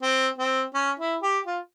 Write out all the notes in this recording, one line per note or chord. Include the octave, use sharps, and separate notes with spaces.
C4
C4
C#4
E4
G4
F4